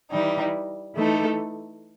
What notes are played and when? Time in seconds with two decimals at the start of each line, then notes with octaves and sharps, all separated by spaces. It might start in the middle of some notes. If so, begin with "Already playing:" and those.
0.11 E3 G3 D#4
0.95 E3 A3 D#4 A4